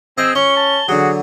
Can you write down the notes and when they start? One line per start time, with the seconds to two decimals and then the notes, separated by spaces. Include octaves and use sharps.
0.18 C4 G#4 D#5 E6
0.35 C#4 C#5 C#6 G7
0.56 A5
0.88 D3 F#3 F#4 G#4